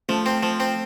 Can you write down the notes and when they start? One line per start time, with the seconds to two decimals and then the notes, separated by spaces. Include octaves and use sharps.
0.09 F3 A3
0.26 C4
0.43 F3
0.60 C4